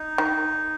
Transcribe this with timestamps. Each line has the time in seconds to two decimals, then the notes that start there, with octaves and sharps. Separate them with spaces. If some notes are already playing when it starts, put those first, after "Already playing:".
Already playing: D#4
0.18 D#3